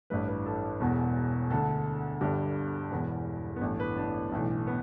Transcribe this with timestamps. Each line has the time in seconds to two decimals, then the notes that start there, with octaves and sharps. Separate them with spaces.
0.10 A1 G2 E3 B4
0.28 B4
0.46 A4
0.80 E1 E2 B2
1.50 D2 D3 A4
2.21 G1 G2 D3 G4
2.91 E1 E2 E3 B3
3.56 B3
3.61 A1 G2 E3 A3
3.80 B4
3.97 D4
4.32 B1 A2 E3
4.67 B3